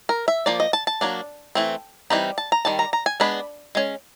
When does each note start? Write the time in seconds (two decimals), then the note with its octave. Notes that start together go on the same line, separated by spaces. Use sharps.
0.09 A#4
0.28 E5
0.46 F3 A#3 D5
0.60 D#5
0.73 A5
0.87 A5
1.01 F#3 A#3 D4
1.55 E3 A3 C4
2.10 E3 G3 C4 D#4 B5
2.38 A5
2.52 A#5
2.65 D#3 G3 A5
2.79 A#5
2.93 A#5
3.06 G#5
3.20 G#3 B3 D4 B5
3.75 G#3 C#4